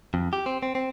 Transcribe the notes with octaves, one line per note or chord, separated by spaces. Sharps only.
F2
G4
C4
C4
C4